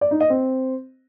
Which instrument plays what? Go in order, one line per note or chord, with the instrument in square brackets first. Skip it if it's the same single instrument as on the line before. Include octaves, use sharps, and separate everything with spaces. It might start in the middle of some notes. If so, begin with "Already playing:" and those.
[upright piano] D5
D#4
D#5
C4